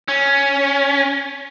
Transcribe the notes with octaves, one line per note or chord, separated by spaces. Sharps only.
C#4